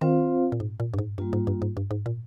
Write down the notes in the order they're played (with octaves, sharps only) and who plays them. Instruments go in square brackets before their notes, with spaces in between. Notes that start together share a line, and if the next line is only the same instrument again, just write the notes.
[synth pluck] D#3 [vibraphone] C4 F4 C5 F5
[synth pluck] A#2
G#2
A#2
G2
G#2
[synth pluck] G2 [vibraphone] G3 A#3 F4
[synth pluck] G#2
G2
G#2
G2
G#2
A#2